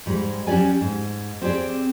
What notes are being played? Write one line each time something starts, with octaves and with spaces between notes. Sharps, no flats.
G#2 G3 G#3
F#3 C#4 G4 D5 G#5
G#2
C4 G4 G#4 D5